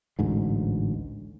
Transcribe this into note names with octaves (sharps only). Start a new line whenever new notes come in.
A1 D2 G#2